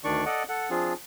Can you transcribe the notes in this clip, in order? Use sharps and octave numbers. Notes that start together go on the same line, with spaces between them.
D2 D#3 D4 D5 C#6
A4 D5 D#5 F#5
A4 F#5
F3 C4 D4 F4 G#4